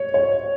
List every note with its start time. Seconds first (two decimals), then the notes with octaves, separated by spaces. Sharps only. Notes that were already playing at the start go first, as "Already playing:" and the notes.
Already playing: C#5
0.14 C#5